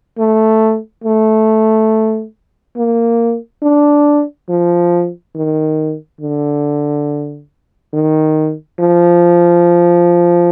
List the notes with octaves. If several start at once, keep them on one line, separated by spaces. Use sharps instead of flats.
A3
A3
A#3
D4
F3
D#3
D3
D#3
F3